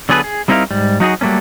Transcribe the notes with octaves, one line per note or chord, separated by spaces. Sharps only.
D3 F#3 B3 G#4 A4 B4
G#4
G3 C4 D#4 E4 A#4 F5
G#2 G3
F#3 D#4 F#4 G#4
F#3 G3 A3 A#3 C#4